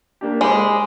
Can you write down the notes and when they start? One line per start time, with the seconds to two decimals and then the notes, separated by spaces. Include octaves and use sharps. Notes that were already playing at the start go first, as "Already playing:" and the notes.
0.21 A#3 D4 G4
0.41 G#3 C5 B5 D6